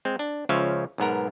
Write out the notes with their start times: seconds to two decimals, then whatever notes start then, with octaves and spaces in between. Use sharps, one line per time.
0.05 G#3 C4
0.19 D4
0.49 C#2 C#3 F3 C#4 E5 F5
0.98 B1 G#2 B3 A#4